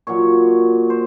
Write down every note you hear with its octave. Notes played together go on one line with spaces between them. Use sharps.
A#2 F#3 C#5
C5